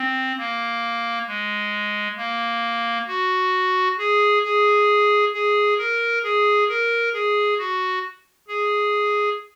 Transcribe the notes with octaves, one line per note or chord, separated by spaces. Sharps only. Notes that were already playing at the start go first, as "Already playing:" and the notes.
Already playing: C4
A#3
G#3
A#3
F#4
G#4
G#4
G#4
A#4
G#4
A#4
G#4
F#4
G#4